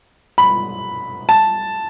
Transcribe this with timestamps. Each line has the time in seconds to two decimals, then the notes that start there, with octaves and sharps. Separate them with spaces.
0.38 B5
1.29 A5